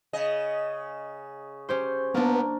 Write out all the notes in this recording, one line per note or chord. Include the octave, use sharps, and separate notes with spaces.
C#3 D#5
C#4 G4 C5
A#3 B3 D4